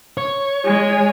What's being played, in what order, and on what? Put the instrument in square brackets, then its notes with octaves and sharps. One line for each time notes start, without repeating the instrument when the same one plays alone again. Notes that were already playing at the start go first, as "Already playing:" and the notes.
[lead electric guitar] C#5
[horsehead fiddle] G#3 G#5